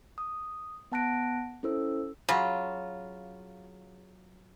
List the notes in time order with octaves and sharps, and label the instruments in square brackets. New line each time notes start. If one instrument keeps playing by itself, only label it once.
[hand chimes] D#6
B3 F#5 A5 F#6 A#6 D7
C#4 E4 A4 C5 E6
[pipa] C#3 [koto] F#3 F4